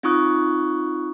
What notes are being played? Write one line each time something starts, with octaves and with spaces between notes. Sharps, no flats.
C4 D#4 F4 C#6 D#6 F#6